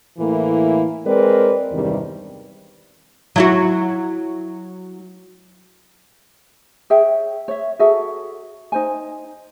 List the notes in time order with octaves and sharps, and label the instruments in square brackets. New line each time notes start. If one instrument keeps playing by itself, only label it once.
[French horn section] A2 E3 A3 A#3 E4
G#3 C4 A#4 B4 D5
E2 G2 C3 D#3 G3
[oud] F#3 E4 F#4
[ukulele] G#4 C#5 E5 G5
C#5 E5
F#4 G#4 A4 E5
D#4 C5 G#5